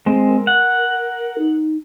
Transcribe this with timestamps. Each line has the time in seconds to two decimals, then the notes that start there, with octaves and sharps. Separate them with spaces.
0.06 G#3 C4
0.29 A#4
0.47 F#5
1.38 D#4